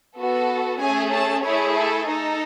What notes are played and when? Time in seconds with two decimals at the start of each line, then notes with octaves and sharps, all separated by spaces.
0.17 B3 F#4 A4
0.80 A3 C#4 G#4 G#5
1.12 A5
1.43 A3 E4 G#4 C#5
1.74 A4
2.06 D#4 A4